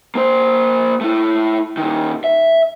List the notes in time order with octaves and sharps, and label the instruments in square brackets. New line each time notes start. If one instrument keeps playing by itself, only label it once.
[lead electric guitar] A#3 C5
A3 E4
A#2 D#3
E5